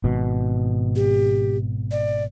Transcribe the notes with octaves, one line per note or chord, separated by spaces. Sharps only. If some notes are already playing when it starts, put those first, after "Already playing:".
G#1 B2
G4
D5